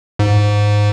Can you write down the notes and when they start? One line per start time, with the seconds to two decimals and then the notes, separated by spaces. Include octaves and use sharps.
0.19 G#2